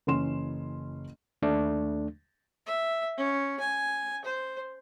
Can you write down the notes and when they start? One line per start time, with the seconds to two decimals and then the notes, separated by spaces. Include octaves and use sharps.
0.07 F#1 E3 C#4 C6 E7
1.42 D#2 A3 D4
2.66 E5
3.17 C#4
3.60 G#5
4.25 C5